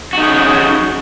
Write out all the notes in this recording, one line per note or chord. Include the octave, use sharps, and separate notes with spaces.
C#4 D#4 F#4 G#4